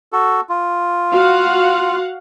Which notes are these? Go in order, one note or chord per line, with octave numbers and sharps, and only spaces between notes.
F#4 A4
F4
F#4 F5 F#5